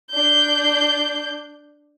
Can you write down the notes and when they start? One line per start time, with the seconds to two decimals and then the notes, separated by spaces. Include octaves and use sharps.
0.11 D4 G6